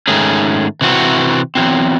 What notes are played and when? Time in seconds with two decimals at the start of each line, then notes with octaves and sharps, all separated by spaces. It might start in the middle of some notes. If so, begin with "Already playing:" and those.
0.07 G#2 D#3 A3 C#4 G#4
0.81 C3 E3 C4 F#4
1.55 E2 D#3 F#3 C4